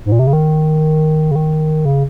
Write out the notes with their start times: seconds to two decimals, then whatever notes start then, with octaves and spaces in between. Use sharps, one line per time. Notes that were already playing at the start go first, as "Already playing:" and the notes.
0.05 G#2
0.12 A#2
0.19 C3
0.27 C#3
0.33 D#3
1.31 C#3
1.36 D#3
1.85 C#3